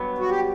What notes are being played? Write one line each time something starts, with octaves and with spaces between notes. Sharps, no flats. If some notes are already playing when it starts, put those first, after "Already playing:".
Already playing: G2 F#3 B3
F#4
G4